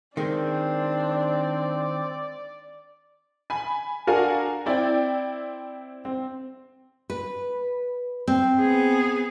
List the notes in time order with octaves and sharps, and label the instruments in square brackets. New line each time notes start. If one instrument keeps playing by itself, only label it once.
[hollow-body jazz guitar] D#3 G#3 [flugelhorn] C4 [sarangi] D4
[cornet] D5
[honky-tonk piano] G#5 B5
D4 F#4 A4 A#4 F5 G#5
C4 E4 D5 G5
C4
[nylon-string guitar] B4
C4
[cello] B3 G#4